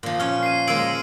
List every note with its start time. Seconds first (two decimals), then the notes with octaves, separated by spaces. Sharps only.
0.03 A#2 F3
0.20 C#4 C#5 F6
0.43 C7 D#7
0.67 G#3 A#3 C#5 E6 D7 F#7